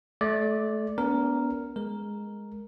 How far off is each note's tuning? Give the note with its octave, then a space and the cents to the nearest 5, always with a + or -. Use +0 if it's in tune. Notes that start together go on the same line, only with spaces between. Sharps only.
A3 -25 D5 +0
B3 -10 D4 -45 A#4 +0
G#3 +0 A#4 +0